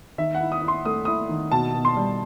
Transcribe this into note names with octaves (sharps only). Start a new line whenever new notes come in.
D#3 E5
F#5
E4
D#6
E4
C6
A3 D#6
E4 D#6
D#3
B2 A5
B2
C6
G3